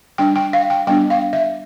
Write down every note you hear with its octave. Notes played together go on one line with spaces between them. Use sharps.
G3 D4 G5
G5
F5
G5
G3 B3 D4 G5
F5
E5